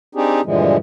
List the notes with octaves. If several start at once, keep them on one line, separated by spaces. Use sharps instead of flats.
C4 D4 D#4 G4 G#4
G2 A#2 D3 E3 F3 G#3